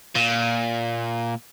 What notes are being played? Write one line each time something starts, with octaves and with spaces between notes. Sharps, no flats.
A#2